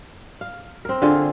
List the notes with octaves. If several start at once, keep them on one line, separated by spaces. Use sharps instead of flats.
F5
C4 A#4
D3 F4 G#4